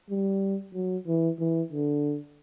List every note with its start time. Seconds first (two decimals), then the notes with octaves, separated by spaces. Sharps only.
0.10 G3
0.75 F#3
1.07 E3
1.39 E3
1.72 D3